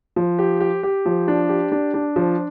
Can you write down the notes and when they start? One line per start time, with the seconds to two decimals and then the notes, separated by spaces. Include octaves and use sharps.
0.16 F3
0.39 G4
0.60 G4
0.83 G4
1.06 F3
1.28 D4
1.49 G4
1.72 D4
1.94 D4
2.16 F3